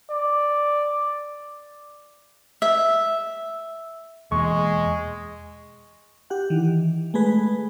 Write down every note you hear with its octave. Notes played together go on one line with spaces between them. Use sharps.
D5
E5
E1 E2 G#3 A#3 C#6
G4 F#5
D#3 E3
G#3 A3 G#4 B4